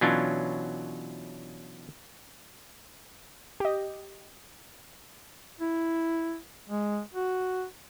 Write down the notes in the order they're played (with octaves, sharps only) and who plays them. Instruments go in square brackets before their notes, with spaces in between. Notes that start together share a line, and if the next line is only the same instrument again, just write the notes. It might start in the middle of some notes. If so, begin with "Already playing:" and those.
[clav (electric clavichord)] B2 E3 F#3 C#4 D4 F4
[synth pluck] G4 D#5
[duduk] E4
G#3
F#4